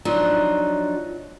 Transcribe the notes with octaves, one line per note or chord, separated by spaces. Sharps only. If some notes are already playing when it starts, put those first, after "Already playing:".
F3 F#3 D4 D#4